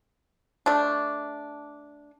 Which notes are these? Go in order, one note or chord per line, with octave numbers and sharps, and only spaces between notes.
A3 D4